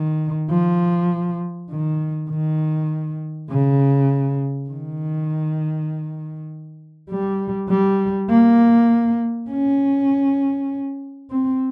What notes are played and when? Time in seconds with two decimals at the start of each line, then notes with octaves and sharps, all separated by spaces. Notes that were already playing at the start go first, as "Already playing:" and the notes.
Already playing: D#3
0.50 F3
1.71 D#3
2.30 D#3
3.50 C#3
4.70 D#3
7.11 G3
7.70 G3
8.30 A#3
9.51 C#4
11.30 C4